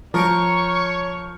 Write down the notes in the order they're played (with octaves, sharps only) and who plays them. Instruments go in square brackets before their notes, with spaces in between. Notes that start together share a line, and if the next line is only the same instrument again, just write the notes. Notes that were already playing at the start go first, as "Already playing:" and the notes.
[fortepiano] F3 [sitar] A#4 [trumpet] C#5 [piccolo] C#6